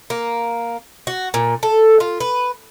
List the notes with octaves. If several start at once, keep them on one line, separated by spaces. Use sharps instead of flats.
A#3
F#4
A#2
A4
F4
B4